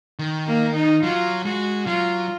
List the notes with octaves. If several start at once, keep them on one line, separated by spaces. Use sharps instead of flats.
D#3
A#3
D#4
F#3 F4
G#3 F#4
F#3 F4